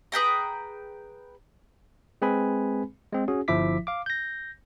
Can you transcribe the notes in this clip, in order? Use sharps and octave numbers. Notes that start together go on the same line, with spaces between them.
G#4 B4 G5 A#5
G#3 C4 G#4 B4 G#5 B5
G#3 C4
C#4 F#4 G#4
G1 F3 E4 E5 D6 B6
F5 D6
G6 A#6